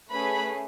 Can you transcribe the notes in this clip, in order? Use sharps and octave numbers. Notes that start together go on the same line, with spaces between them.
A3 C#4 G#4 B4 B5